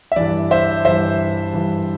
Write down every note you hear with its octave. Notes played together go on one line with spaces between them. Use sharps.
E5
G2 E3 D5
C5 E5
G2 E3 C5 E5
G2 E3